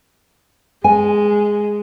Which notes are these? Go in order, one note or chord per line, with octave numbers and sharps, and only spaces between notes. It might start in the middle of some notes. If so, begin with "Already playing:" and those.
G#3 G#5